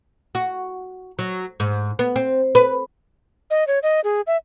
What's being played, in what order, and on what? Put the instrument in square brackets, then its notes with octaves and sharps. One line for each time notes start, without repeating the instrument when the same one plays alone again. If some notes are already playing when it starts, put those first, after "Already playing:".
[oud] F#4
F#3
G#2
B3
C4
B4
[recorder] D#5
C#5
D#5
G#4
E5